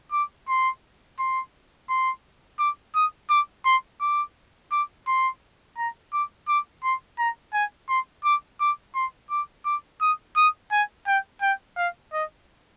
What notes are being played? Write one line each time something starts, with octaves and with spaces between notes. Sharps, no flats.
D6
C6
C6
C6
D6
D#6
D6
C6
D6
D6
C6
A#5
D6
D6
C6
A#5
G#5
C6
D6
D6
C6
D6
D6
D#6
D#6
G#5
G5
G5
F5
D#5